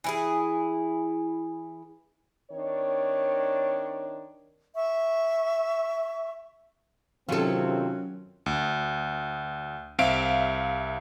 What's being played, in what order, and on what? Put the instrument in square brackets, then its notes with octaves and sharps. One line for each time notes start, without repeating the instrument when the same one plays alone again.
[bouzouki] E3 E4 G#4
[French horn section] D#3 C4 D4 C#5
[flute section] E5 C#6
[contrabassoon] F#2 [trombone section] C3 D#3 C4 [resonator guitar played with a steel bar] F#3 C#4 [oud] F4 A4
[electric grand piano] D2
C2 C4 E5 F5 D7